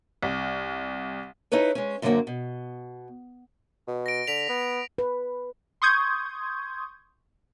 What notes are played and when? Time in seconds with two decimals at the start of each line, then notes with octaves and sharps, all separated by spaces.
0.23 C2
1.52 D#4 E4 A4 B4 C#5
1.75 G#3 C#4
2.02 F#2 D3 F#3 G#3 A#3 C4
2.27 B2
3.87 B2
4.06 A#6 D7
4.27 D3 B6 F7
4.49 B3
4.98 B4
5.82 C6 C#6 D#6 G6 G#6